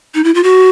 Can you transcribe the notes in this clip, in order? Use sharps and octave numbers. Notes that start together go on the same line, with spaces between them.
D#4
E4
F4
F#4